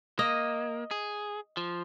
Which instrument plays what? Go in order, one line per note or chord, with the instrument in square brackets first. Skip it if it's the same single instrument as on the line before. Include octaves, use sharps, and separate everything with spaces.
[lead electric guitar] A#3 [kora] D#5
[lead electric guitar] G#4
F3